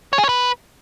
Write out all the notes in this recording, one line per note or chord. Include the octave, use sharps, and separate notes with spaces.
C#5
G#4
C#5
B4